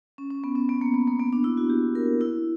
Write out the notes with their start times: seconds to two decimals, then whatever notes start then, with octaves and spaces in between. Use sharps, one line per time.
0.18 C#4
0.31 C#4
0.44 B3
0.55 C#4
0.69 B3
0.81 A#3
0.94 B3
1.07 A#3
1.19 B3
1.33 D4
1.44 E4
1.57 F#4
1.70 G4
1.95 A#4
2.21 E4